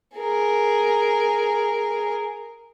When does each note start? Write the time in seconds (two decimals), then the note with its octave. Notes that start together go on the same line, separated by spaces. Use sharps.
0.17 G#4 A#4